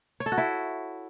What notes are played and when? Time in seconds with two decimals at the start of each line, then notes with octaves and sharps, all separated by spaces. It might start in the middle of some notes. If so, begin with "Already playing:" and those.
0.20 C#5
0.26 A4
0.32 F#4
0.38 E4